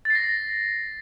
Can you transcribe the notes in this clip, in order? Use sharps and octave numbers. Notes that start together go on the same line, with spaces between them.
A6 A#6 C7